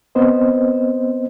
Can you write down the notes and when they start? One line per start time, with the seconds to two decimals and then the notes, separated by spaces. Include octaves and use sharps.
0.15 B3 C4 C5 D#5